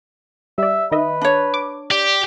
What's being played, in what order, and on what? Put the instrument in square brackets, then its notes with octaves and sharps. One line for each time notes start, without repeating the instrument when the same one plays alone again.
[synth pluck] G3 D5 [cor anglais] E5
[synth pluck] D#3 D#5 E5 [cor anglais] B4
[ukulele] D4 C#5
[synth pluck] D6
[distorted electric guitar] G4 [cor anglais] D5